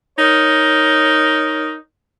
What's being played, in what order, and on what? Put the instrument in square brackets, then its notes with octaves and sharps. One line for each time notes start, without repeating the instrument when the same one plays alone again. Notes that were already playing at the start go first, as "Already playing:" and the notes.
[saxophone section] D#4 A#4 C#5